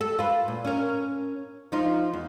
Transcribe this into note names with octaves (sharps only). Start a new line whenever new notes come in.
A4
F4 B4
A#2
C#4 A#4
F3 D#4 F4
E2